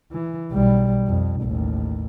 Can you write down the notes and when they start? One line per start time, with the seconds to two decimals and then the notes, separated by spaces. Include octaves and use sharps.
0.12 E3
0.51 B1 G3
1.07 F2
1.42 A1 D#2